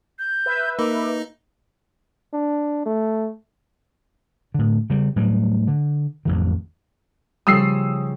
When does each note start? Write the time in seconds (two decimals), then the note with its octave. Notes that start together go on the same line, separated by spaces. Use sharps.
0.19 G6
0.46 B4 E5
0.79 A#3 D#4 D6
2.33 D4
2.85 A3
4.54 A2 D3
4.90 C#3 G3
5.16 A2 F#3 G3
5.68 D3
6.25 A1 F2 D#3
7.47 C#3 F3 G3 D#6 E6 C7